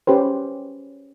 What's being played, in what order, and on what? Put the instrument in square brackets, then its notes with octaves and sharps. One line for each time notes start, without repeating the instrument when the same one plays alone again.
[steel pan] C#4 G4 B4 C5